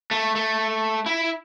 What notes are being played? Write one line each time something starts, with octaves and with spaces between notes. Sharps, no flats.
A3
A3
E4